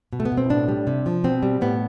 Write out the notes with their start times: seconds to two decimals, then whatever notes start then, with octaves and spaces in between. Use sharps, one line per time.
0.13 B2
0.20 A3
0.25 B3
0.32 B2
0.38 C4
0.50 A2 D4
0.68 G3
0.87 C3
1.06 F3
1.24 B2 C4
1.43 G3
1.61 A2 B3